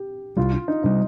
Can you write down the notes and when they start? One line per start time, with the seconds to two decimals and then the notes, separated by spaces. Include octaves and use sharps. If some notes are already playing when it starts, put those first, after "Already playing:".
Already playing: G4
0.37 C2 C3 G3 F4
0.53 F4
0.68 D#4
0.84 C3 G3 D#4